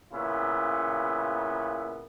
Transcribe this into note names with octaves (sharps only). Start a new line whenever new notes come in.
A#2 C#3 B3 E4